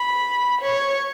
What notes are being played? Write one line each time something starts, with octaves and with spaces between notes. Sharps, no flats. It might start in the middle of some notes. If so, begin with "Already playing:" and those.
Already playing: B5
C#5